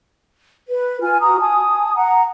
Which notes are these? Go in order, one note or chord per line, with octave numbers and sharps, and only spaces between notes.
B4
F4 G#5 F6
F#4 A#5 D#6
G#5 A5 D#6
F#5 A#5